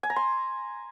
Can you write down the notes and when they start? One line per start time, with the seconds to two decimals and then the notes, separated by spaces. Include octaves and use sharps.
0.03 G#5
0.10 A#5
0.16 C6